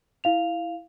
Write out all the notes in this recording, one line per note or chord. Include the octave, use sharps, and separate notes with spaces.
E4 F5 F7